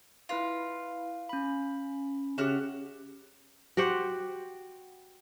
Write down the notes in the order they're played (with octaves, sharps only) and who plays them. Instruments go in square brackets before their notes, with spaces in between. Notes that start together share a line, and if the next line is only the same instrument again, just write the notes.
[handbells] E4 B4 F5 [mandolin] F4
[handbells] C#4 B5
[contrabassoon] C#3 [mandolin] F#4 F6 F#6 [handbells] G4 E5
[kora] F#4 G4 C5 F#5